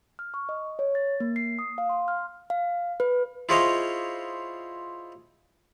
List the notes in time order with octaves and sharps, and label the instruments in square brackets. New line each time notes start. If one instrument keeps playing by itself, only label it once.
[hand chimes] F6
C#6
D#5
C#5
A6
A#3
C7
D#6
F5
C6
F6
F5
B4
[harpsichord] E4 F4 G#4 C5 C#5 D#5